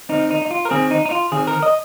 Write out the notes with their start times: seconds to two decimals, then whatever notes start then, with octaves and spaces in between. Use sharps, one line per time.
0.09 D#3 C4 D#4
0.31 D#4
0.42 D#4
0.51 F4
0.65 A#4
0.71 D#3 C4 G#4
0.91 D#4
1.06 D#4
1.11 F4
1.32 D#3 C4 G#4
1.47 A#4
1.63 D#5